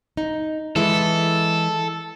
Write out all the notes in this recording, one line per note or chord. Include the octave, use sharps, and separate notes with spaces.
D#4
E3 G#3 E4 A4